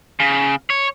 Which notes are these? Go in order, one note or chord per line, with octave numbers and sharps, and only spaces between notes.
C#3
C#5